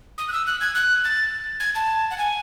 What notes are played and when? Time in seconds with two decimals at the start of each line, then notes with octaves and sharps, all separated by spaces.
0.18 D#6
0.28 F#6
0.32 E6
0.47 F#6
0.61 G#6
0.75 F#6
1.04 A6
1.60 G#6
1.75 A5
2.11 F#5
2.18 G#5